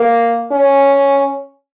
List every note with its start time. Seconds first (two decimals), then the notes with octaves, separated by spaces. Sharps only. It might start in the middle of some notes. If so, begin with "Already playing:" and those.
Already playing: A#3
0.51 C#4